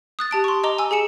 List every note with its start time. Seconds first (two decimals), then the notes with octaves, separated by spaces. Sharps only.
0.19 D#6 F#6 A6
0.31 G4 A5 D7
0.44 C6 C#6
0.63 D#5 A#5 D6 G7
0.79 G#5 E6
0.91 G#4 G#5 C#7 E7